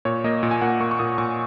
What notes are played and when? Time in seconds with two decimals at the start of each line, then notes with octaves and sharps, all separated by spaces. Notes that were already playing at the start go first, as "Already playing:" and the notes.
0.05 A#2 C#5
0.24 A#3 D#5
0.43 A#2
0.51 G#5
0.62 A#2 F#5
0.80 A#3 C#6
0.91 C#6
0.99 A#2 D#6
1.18 A#2 C#6